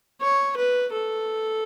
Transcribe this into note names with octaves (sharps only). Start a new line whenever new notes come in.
C#5
B4
A4